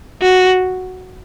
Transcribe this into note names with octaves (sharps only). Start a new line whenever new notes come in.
F#4